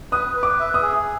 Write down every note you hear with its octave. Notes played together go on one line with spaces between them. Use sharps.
B4 D#6
B4
D6
E5
D#6
G#4